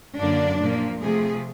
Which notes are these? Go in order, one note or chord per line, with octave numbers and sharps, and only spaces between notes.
F#2 D3 F#3 A#3 D4
A#2 F3 A#3
C3 F3 A3 G#4